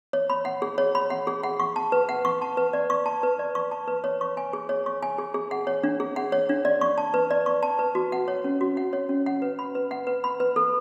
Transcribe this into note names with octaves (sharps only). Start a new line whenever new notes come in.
C#5
B5
F#5
G#4
C#5
B5
F#5
G#4
F#5
C#6
A5
B4
F#5
C#6
A5
B4
D5
C#6
A5
B4
D5
C#6
A5
B4
C#5
C#6
G#5
G#4
C#5
C#6
G#5
G#4
G#4
F#5
C#5
D4
G#4
F#5
C#5
D4
D5
C#6
A5
B4
D5
C#6
A5
B4
F#4
F#5
C#5
C#4
F#4
F#5
C#5
C#4
F#5
B4
B5
B4
F#5
B4
B5
B4
A4